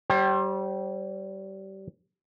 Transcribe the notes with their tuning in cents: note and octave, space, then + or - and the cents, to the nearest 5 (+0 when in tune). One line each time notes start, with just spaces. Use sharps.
G3 -25 C5 +35 G5 -25